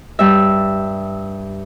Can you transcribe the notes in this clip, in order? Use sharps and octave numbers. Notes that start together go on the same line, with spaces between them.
G2 E5